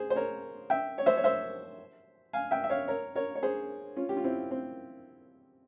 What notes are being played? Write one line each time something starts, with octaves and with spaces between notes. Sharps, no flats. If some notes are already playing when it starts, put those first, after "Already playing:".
Already playing: G#4 C5
C5
A#4 C#5
E5 G5
C#5
C5 E5
C#5
C5 E5
F5 G#5
E5 G5
E5
C#5 F5
A#4 C#5
A#4 C#5
C#5
G#4 C5
C#4 F4
G4
F4
C4 E4
C4